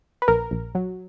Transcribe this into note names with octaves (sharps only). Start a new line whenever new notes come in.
B4
A#1 A#4
A#1
F#3